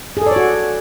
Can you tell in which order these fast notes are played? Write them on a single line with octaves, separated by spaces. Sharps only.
G#4 A4 D5 C#5 F#4